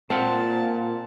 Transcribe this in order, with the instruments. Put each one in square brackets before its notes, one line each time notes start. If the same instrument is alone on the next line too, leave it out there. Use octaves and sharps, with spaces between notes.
[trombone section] A#2 [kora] C4 [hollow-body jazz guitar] C5 F5 F#5 [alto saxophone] A5